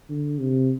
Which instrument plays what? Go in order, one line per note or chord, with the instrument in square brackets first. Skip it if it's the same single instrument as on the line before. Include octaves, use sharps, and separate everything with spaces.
[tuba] D3
C3